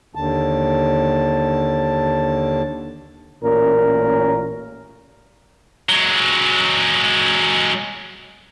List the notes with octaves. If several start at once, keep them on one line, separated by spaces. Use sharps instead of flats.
D#2 D3 A5
A1 A#2 C#4 A#4
F#3 G#3